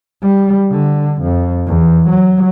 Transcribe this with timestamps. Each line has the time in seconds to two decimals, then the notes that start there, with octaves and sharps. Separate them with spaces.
0.22 G3
0.71 D3
1.22 F2
1.67 E2
2.08 F#3